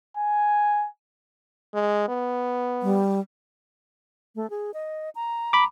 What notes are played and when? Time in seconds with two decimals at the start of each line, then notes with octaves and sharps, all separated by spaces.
0.17 G#5
1.74 G#3
2.08 B3
2.82 G3
4.36 A3
4.50 G#4
4.74 D#5
5.15 A#5
5.53 B5 D6